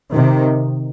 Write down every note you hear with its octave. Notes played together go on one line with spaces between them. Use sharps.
C3 D#3